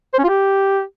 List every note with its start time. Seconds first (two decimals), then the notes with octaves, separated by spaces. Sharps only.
0.14 C5
0.19 C#4
0.24 F4
0.29 G4